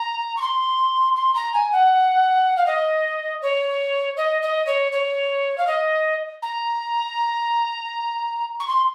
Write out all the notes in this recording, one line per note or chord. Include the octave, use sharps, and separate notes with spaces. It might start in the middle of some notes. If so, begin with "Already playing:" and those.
Already playing: A#5
C#6
C6
C6
A#5
G#5
F#5
F5
D#5
C#5
D#5
D#5
C#5
C#5
F5
D#5
A#5
C#6
C6